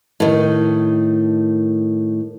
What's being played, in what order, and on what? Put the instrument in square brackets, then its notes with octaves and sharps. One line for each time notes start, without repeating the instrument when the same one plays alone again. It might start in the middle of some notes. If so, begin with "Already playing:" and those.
[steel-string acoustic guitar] A2 D#3